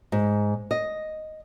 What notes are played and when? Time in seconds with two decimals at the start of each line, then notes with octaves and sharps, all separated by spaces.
0.12 G#2
0.71 D#5